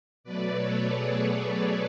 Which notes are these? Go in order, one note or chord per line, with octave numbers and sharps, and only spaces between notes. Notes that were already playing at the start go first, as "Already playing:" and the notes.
B2 F#3 A3 B4 D5
A4 C#5
G#4 B4